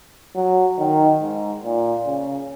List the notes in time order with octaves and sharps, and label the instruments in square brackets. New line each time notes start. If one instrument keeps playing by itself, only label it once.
[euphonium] F#3
D#3
G#2
A#2
C#3